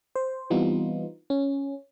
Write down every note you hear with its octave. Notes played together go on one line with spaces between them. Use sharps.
C5
E3 G3 B3 C4 D#4 F4
C#4